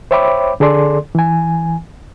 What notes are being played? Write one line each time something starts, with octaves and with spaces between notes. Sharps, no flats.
C5 C#5 E5 G5 B5 D6
D3 G#4 A4 D5 C6
E3 G#5